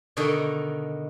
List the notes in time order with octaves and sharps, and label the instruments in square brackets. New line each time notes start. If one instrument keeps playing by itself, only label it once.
[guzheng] B2 D3 D#3 D#4 D#5 A#5